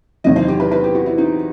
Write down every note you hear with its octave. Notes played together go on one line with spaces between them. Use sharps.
E2 C3 D#3 F#3 D#5
C5
G4
B4
B4
G4
F#4
E4
D#4